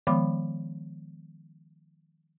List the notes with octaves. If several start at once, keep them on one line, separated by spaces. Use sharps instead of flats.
D#3 F3 G#3 B3 B5 D6